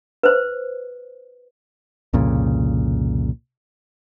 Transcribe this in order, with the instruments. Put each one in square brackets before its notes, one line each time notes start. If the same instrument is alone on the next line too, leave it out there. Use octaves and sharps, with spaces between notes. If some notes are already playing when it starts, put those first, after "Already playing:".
[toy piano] B4 C5
[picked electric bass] C2 F2 A#2 C#3